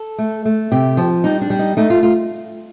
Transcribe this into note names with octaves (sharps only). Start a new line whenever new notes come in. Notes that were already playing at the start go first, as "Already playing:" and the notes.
Already playing: A4
A3
A3
C3 G4
F3
G3 D#4
D4
G3
D#4
A3 D#4
F4
F4